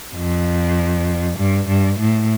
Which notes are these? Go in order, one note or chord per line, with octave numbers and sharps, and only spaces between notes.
F2
G2
G2
A2